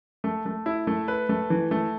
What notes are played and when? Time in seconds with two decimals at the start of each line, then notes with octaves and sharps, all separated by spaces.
0.24 A3
0.46 A3
0.66 E4
0.87 A3
1.08 B4
1.29 A3
1.50 E3
1.71 A3